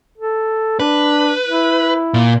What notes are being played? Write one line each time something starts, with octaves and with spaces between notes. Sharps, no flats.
A4
D4 B4
E4
A#2